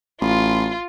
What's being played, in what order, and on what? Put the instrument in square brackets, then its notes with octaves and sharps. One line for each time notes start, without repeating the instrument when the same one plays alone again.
[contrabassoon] A1 [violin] F4